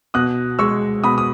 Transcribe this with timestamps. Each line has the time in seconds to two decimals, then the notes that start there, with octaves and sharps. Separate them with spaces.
0.14 B2 D#6 F#6
0.59 G#3 C#6 E6
1.04 B2 B5 D#6
1.18 D#6